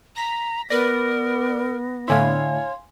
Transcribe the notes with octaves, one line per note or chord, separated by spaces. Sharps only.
A#5 A#6 B6
B3 A#4 B4 D5 A#6
A2 D3 E4 C#5 F5 G#5 C6